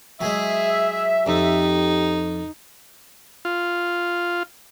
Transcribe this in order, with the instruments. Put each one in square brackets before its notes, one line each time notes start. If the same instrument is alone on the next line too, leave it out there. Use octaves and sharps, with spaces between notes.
[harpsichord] F#3 G#3 [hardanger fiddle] G#4 [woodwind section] E5
[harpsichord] F2 [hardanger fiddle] D#4 [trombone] G4
[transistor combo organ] F4